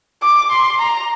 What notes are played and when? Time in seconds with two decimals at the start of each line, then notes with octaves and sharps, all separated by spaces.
0.22 D6
0.51 C6
0.79 A#5